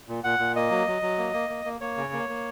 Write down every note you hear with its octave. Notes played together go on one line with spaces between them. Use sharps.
A#2
A#2 F#5
A#2
A#3 D#5
F#3
F#3
F#3
A#3
A#3
A#3
A#3
A#3 C#5
C#3
A#3
A#3